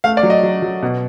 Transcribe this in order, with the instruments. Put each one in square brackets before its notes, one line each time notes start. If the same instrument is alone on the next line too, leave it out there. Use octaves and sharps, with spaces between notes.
[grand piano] A3 F5
D5
F#3
D#5
F#3
F#3
B2